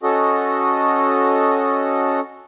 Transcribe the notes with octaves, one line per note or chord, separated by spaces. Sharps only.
C#4 F#4 A4 D#5